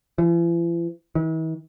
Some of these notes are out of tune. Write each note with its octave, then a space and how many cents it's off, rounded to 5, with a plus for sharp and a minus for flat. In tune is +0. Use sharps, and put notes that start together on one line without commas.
E3 +45
E3 -45